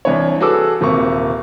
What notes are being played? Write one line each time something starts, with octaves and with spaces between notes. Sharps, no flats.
C2 E3 D4 C#5
F#4 G#4 A4 B4 D6 E6
D#1 C3 A#3 C#6